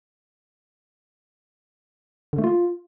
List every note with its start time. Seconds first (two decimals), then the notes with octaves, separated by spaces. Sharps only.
2.33 D3
2.38 A3
2.44 F4